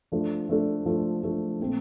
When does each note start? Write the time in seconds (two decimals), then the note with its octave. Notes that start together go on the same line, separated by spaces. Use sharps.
0.12 F3 A3 D4 A4
0.49 F3 A3 D4 A4
0.86 F3 A3 D4 A4
1.23 F3 A3 D4 A4
1.59 A#2 A3 C4